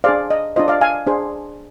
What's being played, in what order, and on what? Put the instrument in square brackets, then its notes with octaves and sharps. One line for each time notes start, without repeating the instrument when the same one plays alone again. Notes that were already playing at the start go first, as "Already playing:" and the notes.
[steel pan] D4 G#4 C5 D5 F5
D#5
D4 F4 C5 D#5
D5 F5
F5 G#5
D4 G#4 C5